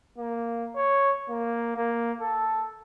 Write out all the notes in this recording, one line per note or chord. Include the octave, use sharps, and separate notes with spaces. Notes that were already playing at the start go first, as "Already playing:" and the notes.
A#3
C#5
A#3
A#3
A4